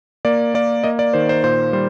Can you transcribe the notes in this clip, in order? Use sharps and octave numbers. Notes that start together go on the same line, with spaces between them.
A#3 D5
A#3 D5
A#3 D#5
D5
D#3 C5
C5
A#2 C5
G3 C5